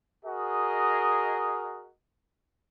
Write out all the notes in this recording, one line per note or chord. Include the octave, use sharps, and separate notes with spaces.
F#4 G#4 A#4 D#5